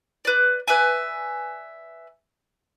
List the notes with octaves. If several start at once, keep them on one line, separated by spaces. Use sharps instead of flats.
B4 D5
B4 D5 E5 G#5